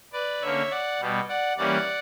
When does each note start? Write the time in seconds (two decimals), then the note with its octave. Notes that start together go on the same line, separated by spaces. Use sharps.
0.13 B4 D5
0.42 D3 A#3 C#4 C#5 E5
0.71 D5 F#5
1.00 B2 G3 B3
1.29 D5 F#5
1.57 E3 G3 A#3 C#4 D5 F#5